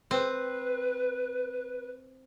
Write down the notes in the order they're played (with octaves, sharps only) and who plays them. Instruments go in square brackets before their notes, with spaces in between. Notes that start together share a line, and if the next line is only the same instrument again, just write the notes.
[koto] C4 [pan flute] B4